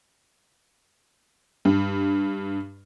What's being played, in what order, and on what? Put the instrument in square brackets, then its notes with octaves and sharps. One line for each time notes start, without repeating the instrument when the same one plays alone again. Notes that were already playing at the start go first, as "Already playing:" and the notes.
[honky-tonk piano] G2